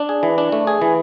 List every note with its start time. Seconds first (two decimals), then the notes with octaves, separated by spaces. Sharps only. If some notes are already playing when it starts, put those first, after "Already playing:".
Already playing: D4
0.09 G#4
0.23 E3
0.38 D4
0.52 A3
0.67 G#4
0.82 E3